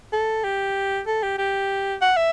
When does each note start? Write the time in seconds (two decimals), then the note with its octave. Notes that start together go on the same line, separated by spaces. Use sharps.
0.12 A4
0.44 G4
1.07 A4
1.23 G4
1.38 G4
2.01 F#5
2.17 E5